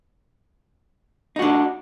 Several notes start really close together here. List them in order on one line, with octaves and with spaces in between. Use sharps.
D#4 F#4 D4